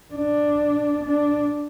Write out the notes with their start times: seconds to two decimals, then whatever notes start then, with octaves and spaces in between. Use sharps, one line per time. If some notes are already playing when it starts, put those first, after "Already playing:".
0.14 D4
1.04 D4